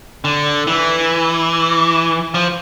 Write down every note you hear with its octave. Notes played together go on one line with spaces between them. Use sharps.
D3
E3
F3